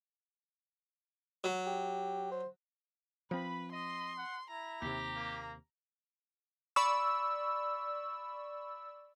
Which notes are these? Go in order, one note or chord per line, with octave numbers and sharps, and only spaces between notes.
F#3
G4
C5
F3 C4 B4 B5
D#5 C6
F#5
E4 A#5
D#2 C3 G4
A#3
D5 B5 C#6 E6